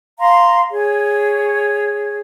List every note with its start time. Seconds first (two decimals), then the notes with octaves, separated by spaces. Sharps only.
0.19 F5 A#5 C6
0.71 G#4 C#5